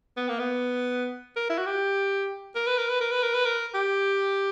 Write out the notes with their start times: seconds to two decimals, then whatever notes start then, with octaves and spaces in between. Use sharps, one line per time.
0.17 B3
0.28 A#3
0.39 B3
1.36 A#4
1.49 E4
1.58 F#4
1.66 G4
2.55 A#4
2.67 B4
2.78 A#4
2.89 B4
3.01 A#4
3.12 B4
3.23 A#4
3.34 B4
3.45 A#4
3.74 G4